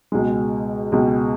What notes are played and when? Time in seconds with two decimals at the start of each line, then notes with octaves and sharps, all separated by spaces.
0.12 C#2 B2 G#3
0.92 C#2 B2 G#3